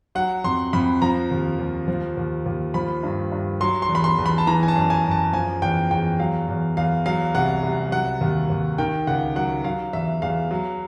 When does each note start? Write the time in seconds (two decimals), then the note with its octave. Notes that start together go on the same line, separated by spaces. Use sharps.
0.15 F#3 F#5
0.44 F2 C6
0.73 F2 B5
1.02 F3 A#5
1.31 D#2
1.59 D#2
1.88 F3
2.17 D#2
2.46 D#2
2.74 F3 B5
3.03 G2
3.32 G2
3.61 F#3 C6
3.82 C6
3.89 E2
3.95 B5
4.04 C6
4.18 E2
4.26 B5
4.38 A5
4.47 E3 A#5
4.63 G#5
4.68 A5
4.75 F#2
4.90 G#5
5.05 F#2
5.11 A5
5.33 F3 G#5
5.62 E2 G5
5.91 E2 G5
6.19 F#3 F5
6.48 E2
6.77 E2 F5
7.06 F#3 F5
7.35 C2 F#5
7.63 C2
7.92 F#3 F#5
8.21 D#2
8.50 D#2
8.78 D#3 G5
9.07 C#2 F#5
9.36 F#3 F#5
9.64 F#3 F5
9.93 E2 E5
10.22 E2 F5
10.51 F#3